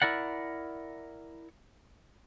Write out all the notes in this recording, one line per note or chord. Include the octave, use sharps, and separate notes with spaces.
E4 A#4 D5 F#5